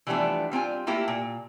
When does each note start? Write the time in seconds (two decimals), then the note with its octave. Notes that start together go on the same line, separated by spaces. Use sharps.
0.07 E3 F3 G3 A3 B3 D4
0.52 G3 C4 F4 G#5
0.87 A3 A#3 E4 F4 G4
1.08 A#2